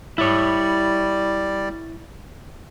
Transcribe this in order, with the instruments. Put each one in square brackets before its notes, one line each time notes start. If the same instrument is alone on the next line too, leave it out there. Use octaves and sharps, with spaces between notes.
[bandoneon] G3 D5 [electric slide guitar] E4 C#5